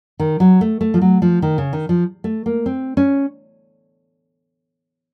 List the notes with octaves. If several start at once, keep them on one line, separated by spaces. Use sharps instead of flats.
D#3
F#3
A3
A3
F3
F#3
F3
D#3
C#3
D#3
F3
A3
A#3
C4
C#4